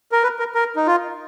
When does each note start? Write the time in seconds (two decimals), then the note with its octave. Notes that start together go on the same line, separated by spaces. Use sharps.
0.12 A#4
0.23 B4
0.39 A#4
0.55 A#4
0.76 D#4
0.86 F4